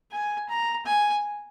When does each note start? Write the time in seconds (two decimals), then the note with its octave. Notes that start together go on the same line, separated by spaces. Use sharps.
0.11 G#5
0.49 A#5
0.86 G#5